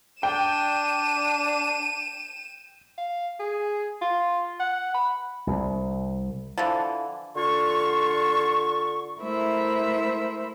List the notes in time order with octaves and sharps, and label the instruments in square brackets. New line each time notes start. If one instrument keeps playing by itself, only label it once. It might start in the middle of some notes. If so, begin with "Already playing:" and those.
[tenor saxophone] D4 [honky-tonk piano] G5 [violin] D#7 E7
[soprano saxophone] F5
G#4
F4
F#5
B5
[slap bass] C2
[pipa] D3 E3 F3
[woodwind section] D3 F4 C#6
[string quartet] A3 E4 A#4 C5 E5